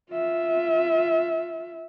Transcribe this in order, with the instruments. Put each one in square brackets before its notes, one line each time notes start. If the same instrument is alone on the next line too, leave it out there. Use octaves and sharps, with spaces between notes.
[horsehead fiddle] F4 E5